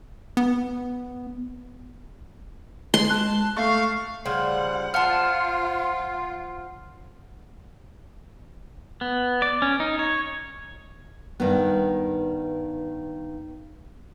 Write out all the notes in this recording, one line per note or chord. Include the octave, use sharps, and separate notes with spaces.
B3
G#3 C6
A5 F#6
A3 F5 C#6
C#3 F3 G3 F#5 C6
F3 F4 F#5 A5 C6 F6
B3
D5
C#4
D#4
C#5
G2 D#3 B3